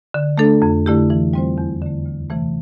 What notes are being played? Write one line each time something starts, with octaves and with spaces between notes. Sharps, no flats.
D3
A3 D4 A4
F2
D3 A3 E4 G4
E3
G3 C4 F4 C5
E2
D3 A3
D2
C3 E3 A3